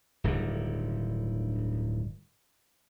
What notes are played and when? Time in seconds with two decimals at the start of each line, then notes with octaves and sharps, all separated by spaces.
0.24 D1 G2 D3 D#3